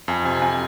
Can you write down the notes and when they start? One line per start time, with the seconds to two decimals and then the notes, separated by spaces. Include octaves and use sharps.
0.08 F2 G#5
0.25 C3 G#5
0.42 F2 G#5